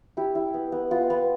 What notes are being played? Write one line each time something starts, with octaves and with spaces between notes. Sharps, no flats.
E4 G4
E4
B3
B3
B3 F4
B3